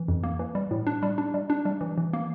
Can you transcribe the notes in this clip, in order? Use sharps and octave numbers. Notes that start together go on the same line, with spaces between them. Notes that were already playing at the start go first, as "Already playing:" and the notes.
Already playing: E3
F2
A#3
E3
G3
A2
D4
G3
D4
G3
D4
G3
E3
E3
A#3